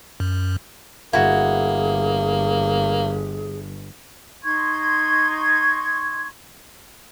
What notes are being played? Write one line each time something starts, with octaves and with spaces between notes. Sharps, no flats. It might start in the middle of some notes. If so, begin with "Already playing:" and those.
F#2
G1 A#3 E4 F#4 G#4
D#4 C6 C#6 G#6